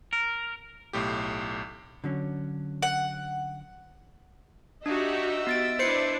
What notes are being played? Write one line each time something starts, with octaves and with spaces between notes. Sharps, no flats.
A#4
B1 A2 G4
D3 F#3 C#4
F#5
D4 D#4 F#4 G4 D#5 E5 E6
B3 A6 D7
D4 E4 B4 C5 C7 C#7